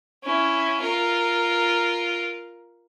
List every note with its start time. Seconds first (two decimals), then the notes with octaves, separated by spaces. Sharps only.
0.23 C#4 E4
0.80 F4 A#4